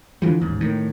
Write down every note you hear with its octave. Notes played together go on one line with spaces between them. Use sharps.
D3 E3 F3 G3
A1 D#2 G#2
A2 D#3